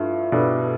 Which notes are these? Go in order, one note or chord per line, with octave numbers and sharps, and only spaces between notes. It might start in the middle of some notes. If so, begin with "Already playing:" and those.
Already playing: G2 F3 A3 E4 A4
G2 B2 G3 D4 A4